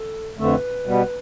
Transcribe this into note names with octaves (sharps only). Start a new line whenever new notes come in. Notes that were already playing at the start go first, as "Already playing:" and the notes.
Already playing: A4
F2 D3 A3 B4
B2 G3 B3